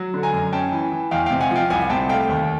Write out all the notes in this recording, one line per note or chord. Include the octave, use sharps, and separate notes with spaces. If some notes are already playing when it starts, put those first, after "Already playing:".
Already playing: F#3
D3
G#5 A#5
F#2
C#4 G5 A5
E3
E3
E2 F5 G5
C3 F5 G5
F#5 G#5
F3 F5 G5
C2 F#5 G#5
C3 G5 A5
A3 F5 G5
D#2